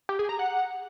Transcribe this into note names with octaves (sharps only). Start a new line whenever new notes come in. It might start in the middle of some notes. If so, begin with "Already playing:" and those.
G4
G#4
A#5
F#5